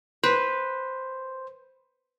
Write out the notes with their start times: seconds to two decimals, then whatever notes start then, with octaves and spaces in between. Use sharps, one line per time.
0.24 B4 C5